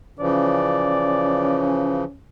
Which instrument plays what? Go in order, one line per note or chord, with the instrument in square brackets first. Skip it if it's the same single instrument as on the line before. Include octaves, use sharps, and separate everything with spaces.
[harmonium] C#3 E3 F3 [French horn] C#4 [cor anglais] D5